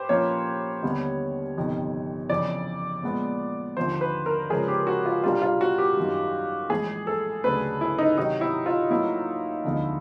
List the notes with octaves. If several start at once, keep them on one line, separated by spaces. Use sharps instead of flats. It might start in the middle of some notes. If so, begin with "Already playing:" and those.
Already playing: G4 B4 C5
A#2 F3 A#3 C#4 C#5
D#2 D3 G3 B3 D4
G1 F2 C3 D#3
F2 C#3 E3 D5
A#2 F3 G#3 B3
D#2 D3 F3 A#3 C5
B4
A#4
C#3 F3 G#3 C#4 G#4
G4
F#4
F4
C2 A#2 G3 A#3 D4 F4
F4
F#4
G4
F#2 D#3 G3
A#1 A2 E3 G#3 G#4
A4
D2 C#3 F#3 A3 D4 B4
E4
D#4
C3 D#3 F#3 D#4
E4
F4
A2 F#3 A#3 E4
E1 D2 D3 F3